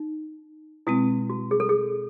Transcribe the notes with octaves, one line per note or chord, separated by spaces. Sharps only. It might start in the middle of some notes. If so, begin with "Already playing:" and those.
Already playing: D#4
B2 G#3 C4 E4
F#4
G#4
A4
G#4